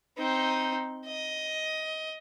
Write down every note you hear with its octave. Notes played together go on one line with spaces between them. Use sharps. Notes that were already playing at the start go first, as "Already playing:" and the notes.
C4 D#4
D#5